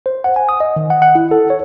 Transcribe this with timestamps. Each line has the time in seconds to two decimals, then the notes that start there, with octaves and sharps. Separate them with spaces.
0.06 C5
0.24 F#5
0.36 G#5
0.49 D#6
0.60 D#5
0.76 D#3
0.90 F#5
1.02 F#5
1.15 E4
1.31 A4
1.50 C#5